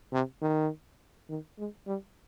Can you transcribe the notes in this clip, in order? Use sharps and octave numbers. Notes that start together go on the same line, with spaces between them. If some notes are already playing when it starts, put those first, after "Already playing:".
C3
D#3
D#3
G#3
G3